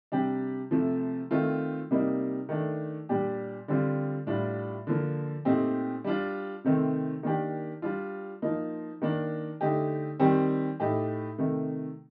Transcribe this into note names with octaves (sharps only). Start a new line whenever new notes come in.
C3 G3 D4 G4
C3 F3 A3
D#3 A3 C4 F4
C3 G3 A#3 D#4
D#3 A3 D4
A#2 G3 D4 G4
D3 G3 C4 F4
A2 G3 D4 F4
D3 F3 A#3
A#2 A3 C4 D#4 G4
G3 D4 F4
C3 D#3 A3 C4
D#3 A#3 D4 G4
G3 D4 F4
F3 A#3 D#4
D#3 A#3 D4
D3 A3 D#4 G4
D#3 G3 C4 G4
A2 A3 D#4 G4
C3 D#3 A3